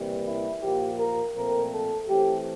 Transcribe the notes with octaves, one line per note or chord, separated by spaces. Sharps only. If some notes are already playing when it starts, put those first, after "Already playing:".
Already playing: C3 E3 G3 A#3
E4
A#2 F3 A#3 G4
A#4
A#2 F3 A3 C4 A#4
A4
E3 A3 C4 G4